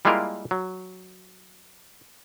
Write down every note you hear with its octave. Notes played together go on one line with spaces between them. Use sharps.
G3 G#3 A#3 E4 F4 A#4
F#3